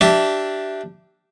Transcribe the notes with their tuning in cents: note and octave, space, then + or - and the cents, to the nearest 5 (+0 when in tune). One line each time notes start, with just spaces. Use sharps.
D4 +0 G4 -25 E5 +0